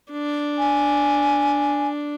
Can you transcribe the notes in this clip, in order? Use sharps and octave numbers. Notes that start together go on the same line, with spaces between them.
D4
G#5